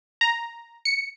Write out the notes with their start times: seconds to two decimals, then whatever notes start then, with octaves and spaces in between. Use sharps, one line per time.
0.21 A#5
0.85 C#7